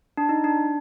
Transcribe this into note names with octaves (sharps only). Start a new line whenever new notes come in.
D4
D#4
D4